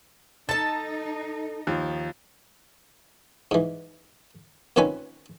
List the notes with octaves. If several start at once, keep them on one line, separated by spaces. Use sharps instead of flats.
D#4 A4 A5 A6
D#2 F3
G#2 E3
A#2 D#3 C4 C#4 B4 G#5